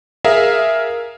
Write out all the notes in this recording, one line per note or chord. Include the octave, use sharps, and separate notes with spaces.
G#4 A#4 E5 F5